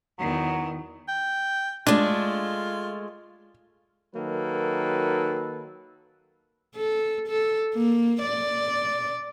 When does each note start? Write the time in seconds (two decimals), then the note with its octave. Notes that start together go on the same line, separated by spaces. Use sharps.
0.19 E2 D#3 F#3
1.08 G5
1.87 G#3 A3 D4 F4
4.16 D#3 F#3 A#3 A4 B4
6.75 A4
7.28 A4
7.75 A#3
8.23 D5